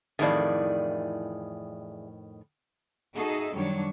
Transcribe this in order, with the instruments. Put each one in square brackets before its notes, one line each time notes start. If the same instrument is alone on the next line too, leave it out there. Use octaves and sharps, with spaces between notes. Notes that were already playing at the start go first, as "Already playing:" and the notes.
[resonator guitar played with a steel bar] F2 A2 D#3 [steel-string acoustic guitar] E3 G#4 D5
[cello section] D#4 F#4 G#4 A4 D#5 E5
F#2 D#3 F#3 G3 D4 C#5